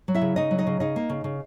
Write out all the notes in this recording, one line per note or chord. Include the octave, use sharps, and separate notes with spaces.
F#3
E4 E5
C#3
C#3 D#4 D#5
F#3
D#4 D#5
C#3
C#3 D#4 D#5
A#3
C#3
C#3